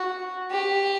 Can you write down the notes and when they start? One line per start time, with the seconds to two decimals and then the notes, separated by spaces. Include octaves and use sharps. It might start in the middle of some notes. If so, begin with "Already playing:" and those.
Already playing: F#4
0.51 G4